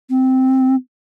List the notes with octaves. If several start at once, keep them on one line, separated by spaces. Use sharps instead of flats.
C4